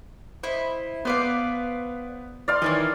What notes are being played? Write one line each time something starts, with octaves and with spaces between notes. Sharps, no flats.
E4 C5 D#5
B3 B4 C5 D5 F5
D5 F5 C6
D#3 E3 E4 C#5 D#5